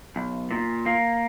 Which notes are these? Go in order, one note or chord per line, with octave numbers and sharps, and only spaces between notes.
B1
A#2
A#3